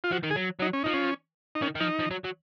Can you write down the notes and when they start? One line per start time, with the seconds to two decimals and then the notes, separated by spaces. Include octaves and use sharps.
0.04 F4
0.12 F3 F#4
0.24 D#3
0.30 G#4
0.36 F#3
0.60 F#3 D#4
0.73 C#4
0.84 F3 D#4
0.94 C#4
1.55 D#4
1.62 D#3 C#4
1.75 D#3
1.80 F3 D#4
2.00 F3
2.11 F#3
2.24 F#3